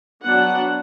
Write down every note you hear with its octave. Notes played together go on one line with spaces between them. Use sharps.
F#3 B3 D4 F#5